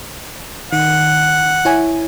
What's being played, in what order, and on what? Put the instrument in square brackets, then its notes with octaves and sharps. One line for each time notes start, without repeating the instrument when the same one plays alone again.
[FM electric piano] D#3 [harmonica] F#5
[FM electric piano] E4 C#5 G#5